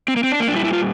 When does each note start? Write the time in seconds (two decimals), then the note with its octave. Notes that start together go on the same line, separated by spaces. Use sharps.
0.08 C4
0.16 A#3
0.23 C4
0.32 D4
0.40 A#3
0.47 A#2 D4
0.52 G3 E4
0.64 E4
0.73 F4